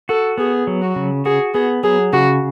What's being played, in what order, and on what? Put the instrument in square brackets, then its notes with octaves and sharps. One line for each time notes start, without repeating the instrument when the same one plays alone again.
[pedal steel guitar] F#4 [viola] A4
[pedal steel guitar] B3 [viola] G#4
[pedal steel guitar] F#3
[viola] F#4
[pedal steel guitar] C#3
[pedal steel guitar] F#4 [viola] G#4
[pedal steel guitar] B3 [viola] G#4
[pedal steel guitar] F#3 [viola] G#4
[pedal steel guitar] C#3 [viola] F#4